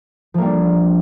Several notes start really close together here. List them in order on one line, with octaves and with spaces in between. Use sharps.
F3 A#3 G3 D4